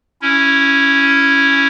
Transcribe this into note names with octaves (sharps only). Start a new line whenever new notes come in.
C#4 E4